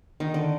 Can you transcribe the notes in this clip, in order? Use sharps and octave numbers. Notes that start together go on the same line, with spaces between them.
D#3
D3